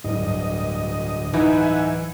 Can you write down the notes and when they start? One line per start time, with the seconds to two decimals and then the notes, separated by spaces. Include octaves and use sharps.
0.04 D1 D2 G2 D#5
1.34 E3 D#4 E5 F#5 G#5